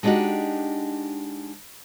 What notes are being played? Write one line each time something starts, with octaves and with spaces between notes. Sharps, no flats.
G#3 B3 D4 D#4 F#4 G4